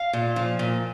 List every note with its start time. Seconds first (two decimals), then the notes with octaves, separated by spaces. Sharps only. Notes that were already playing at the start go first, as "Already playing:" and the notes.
Already playing: F5
0.13 A#2
0.36 F3
0.59 A#2